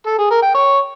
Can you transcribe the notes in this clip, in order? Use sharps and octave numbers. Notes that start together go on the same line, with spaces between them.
A4
G#4
A#4
G5
C#5